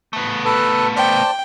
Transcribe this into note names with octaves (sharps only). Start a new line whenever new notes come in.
A3 B3
A4 B4 A5
C5 D5 G5 A5